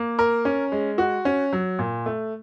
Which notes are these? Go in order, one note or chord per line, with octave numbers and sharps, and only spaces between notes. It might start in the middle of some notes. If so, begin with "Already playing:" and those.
Already playing: A#3
A#4
C#4
G#3
F#4
C#4
F#3
A#2
A3